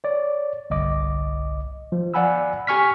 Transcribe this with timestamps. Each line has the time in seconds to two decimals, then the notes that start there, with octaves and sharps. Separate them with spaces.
0.04 C#5 D5
0.70 G1 C2 D#5 D6
1.92 F3
2.14 D5 F5 F#5 G#5 B5 E6
2.67 G4 G#5 C#6 F6 B6